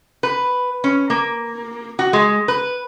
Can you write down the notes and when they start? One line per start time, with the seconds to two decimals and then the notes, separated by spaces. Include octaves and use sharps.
0.23 B4
0.84 C#4
1.10 A#3
1.99 F#4
2.13 G#3
2.48 B4